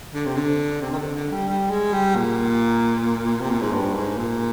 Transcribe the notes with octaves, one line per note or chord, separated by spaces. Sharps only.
D3
C3
D3
C3
D#3
D3
D3
G3
G3
G#3
G3
A#2
C3
A#2
G#2
G2
G#2
A#2